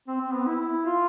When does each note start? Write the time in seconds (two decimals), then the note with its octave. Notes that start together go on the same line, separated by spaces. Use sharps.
0.07 C4
0.20 C4
0.34 B3
0.47 E4
0.86 F4